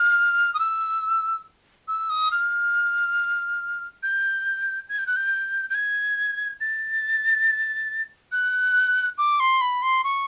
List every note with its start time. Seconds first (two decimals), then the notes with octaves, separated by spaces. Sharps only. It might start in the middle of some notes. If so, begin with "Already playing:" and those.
Already playing: F6
0.54 D#6
0.59 E6
1.88 E6
2.10 D#6
2.32 F6
4.03 G6
4.89 G#6
4.99 G6
5.07 F#6
5.16 G6
5.70 G6
5.75 G#6
6.61 A6
8.32 F#6
9.18 D6
9.40 C6
9.61 B5
9.82 C6
10.04 C#6